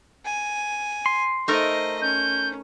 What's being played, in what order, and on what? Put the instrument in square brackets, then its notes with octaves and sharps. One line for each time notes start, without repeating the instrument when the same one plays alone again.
[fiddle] G#5
[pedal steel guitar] C6
[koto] A3 D#4 A#4 [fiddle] C5 D#5
[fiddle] C#4 [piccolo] G6